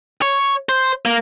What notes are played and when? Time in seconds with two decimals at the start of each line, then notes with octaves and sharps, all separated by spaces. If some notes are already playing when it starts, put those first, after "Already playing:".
0.22 C#5
0.69 C5
1.05 A#3